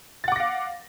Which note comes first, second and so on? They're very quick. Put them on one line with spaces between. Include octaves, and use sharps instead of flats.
A6 F#5 D6 A#6 F5